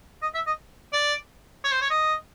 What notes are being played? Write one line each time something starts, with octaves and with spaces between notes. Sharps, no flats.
D#5
E5
D#5
D5
C#5
C5
C#5
D#5